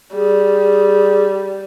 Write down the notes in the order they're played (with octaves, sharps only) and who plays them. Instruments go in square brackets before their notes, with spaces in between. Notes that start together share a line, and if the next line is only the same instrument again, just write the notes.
[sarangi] G3 [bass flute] G#4